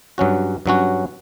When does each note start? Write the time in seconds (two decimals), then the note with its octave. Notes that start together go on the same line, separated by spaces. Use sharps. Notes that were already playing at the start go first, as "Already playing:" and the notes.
0.18 G2 F#3 C#4 F#4
0.66 G2 F#3 C#4 F#4